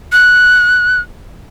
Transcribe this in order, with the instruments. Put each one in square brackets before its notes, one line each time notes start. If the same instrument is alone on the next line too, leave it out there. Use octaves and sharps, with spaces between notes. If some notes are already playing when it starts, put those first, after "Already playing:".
[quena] F#6